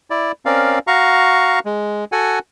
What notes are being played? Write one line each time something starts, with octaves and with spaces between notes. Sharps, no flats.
E4 D5
C4 C#4 A#4 D5 F5
F#4 F5 A#5 C#6
G#3
F#4 A4 F#5 G#5